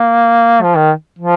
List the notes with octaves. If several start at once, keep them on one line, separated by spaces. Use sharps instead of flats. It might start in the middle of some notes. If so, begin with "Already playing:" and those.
Already playing: A#3
F3
D#3
F3